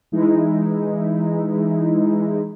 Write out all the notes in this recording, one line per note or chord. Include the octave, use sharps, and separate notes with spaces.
E3 G#3 D#4 E4